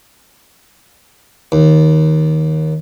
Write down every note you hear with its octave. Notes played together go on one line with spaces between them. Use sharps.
D#2